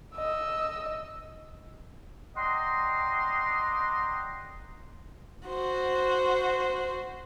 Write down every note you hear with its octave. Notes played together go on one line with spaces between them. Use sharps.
D#5 E6
D5 D#5 F#5 G5 A#5 C6
F#4 C5